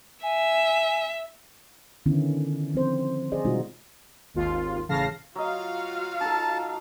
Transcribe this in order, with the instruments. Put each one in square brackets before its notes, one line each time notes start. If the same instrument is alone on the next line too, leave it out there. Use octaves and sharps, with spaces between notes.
[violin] E5 [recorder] G#5
[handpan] D3 D#3 B3 C#4 E4
F3 C4 C5
G#4 C5 D5 D#5
B2 G3 G#3 D#4 F4 F#4
[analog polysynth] G#1 D#2 F4
A1 C#3 F5 A5 A#6 C7
[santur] F#3 D#5 [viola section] F4 F#4 F5
[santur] D#4 A4 [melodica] A5